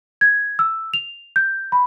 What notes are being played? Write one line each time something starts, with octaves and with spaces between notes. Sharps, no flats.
G#6
E6
F7
G6
B5